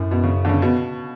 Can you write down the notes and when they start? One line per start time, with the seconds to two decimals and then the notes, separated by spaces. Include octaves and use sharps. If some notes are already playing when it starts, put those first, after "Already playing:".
Already playing: F#2 A2
0.11 B2
0.23 C#3
0.45 D3
0.49 C#3
0.62 B2